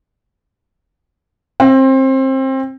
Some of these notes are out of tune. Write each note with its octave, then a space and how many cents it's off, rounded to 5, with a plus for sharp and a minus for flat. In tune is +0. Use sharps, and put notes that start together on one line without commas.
C4 +25